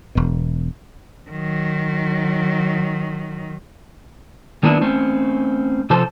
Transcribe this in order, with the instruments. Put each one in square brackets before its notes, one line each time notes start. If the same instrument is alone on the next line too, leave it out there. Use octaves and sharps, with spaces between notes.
[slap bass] E1 B2
[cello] D#3 F#3
[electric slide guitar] D#3 F#3 A#3 B3 D4 E4
A3 C4 C#4
C3 F3 A4 C5